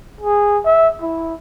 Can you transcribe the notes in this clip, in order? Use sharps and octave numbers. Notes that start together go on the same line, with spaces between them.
G#4
E5
E4